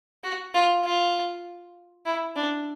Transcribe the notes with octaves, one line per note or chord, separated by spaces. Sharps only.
F#4
F4
F4
E4
D4